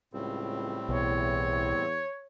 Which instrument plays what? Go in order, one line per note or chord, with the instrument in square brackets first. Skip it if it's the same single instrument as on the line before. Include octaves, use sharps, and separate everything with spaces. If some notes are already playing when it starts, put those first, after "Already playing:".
[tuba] C#2 [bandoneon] A2 G3 C4
[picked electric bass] B1 B2 [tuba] E2 [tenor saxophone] C#5